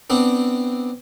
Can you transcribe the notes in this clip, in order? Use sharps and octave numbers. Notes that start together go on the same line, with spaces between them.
B3 C4 D4